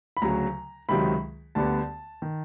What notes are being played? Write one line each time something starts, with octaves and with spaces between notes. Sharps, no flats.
B5
D2 C#3 F#3 A#5
C#2 C3 D#3 F#3 B5
D2 D3 G3 B3 A5
D#3